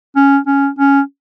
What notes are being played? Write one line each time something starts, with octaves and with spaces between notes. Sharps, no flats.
C#4
C#4
C#4